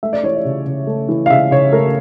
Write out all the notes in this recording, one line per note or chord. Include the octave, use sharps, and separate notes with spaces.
A3 E5
D5
E3 C#5
D5
C#3
C#3
A3
E3
F5
C#3 E5
C#3 C#5
A3 A#4